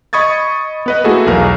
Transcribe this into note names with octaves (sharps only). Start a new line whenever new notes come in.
D#5 B5 C#6 D#6 G#6 A6
B3 B4 D#5
A3 A#3 E4 F#4 G#4 A4
B1 E2 A#4 B4 F5